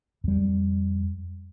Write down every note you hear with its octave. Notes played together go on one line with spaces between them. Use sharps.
F2 G3